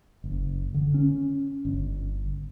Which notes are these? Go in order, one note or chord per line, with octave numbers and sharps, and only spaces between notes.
F#1
D3
C#4
G1